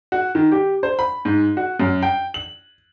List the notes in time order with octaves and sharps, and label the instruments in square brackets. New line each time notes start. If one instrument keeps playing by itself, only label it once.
[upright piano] F#4
D#3
G4
C5
B5
G#2
F#4
F#2
G5
F#7